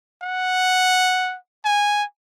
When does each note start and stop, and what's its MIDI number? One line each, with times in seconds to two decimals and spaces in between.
0.22 1.37 78
1.65 2.03 80